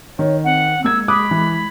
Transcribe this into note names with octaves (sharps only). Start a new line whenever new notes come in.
D#3 C#5
C4 F#5
G#3 A#3 A#4 E6 G#6
B5 D6 D#6 F#6
E3